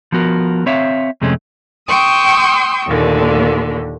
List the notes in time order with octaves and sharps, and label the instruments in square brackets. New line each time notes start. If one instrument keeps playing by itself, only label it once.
[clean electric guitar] F3 B3 F#4 A#4
C4 C#5 E5 F5
F2 C3 G#3 A3 C#4
[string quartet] G5 C6 C#6 D#6 E6 G6
D#2 A#2 D3